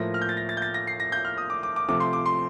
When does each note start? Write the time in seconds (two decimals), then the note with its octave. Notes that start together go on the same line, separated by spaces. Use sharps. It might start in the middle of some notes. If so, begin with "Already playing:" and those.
Already playing: A2 F3 A#3 A#6
0.14 F6
0.22 G6
0.29 A6
0.37 A#6
0.49 A6
0.57 G6
0.62 A6
0.74 A#6
0.87 C7
1.00 A#6
1.12 G6
1.25 F6
1.38 D#6
1.50 D6
1.63 D6
1.76 D6
1.88 C3 F3 A3 D6
2.00 C6
2.13 D6
2.26 C6